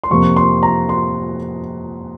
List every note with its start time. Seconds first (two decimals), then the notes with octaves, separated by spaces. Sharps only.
0.04 C6
0.11 F2 C3 F3 A#3 C#6
0.37 C6
0.63 A#5
0.89 C6